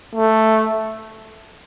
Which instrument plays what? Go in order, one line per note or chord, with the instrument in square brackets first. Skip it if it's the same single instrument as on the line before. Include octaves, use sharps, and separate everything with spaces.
[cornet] A3